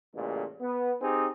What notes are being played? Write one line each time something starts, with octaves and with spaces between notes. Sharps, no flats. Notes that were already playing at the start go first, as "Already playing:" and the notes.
A1 A#2 C#3 G#3
B3
C4 D#4 G4 G#4